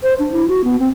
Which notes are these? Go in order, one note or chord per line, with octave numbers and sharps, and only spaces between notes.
C5
D4
E4
F#4
B3
C4